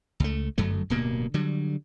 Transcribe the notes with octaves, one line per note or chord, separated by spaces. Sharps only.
C#2 A3
G1 F#2 F#3 A3
D1 G2 B2 A#3
D3 F#3 G3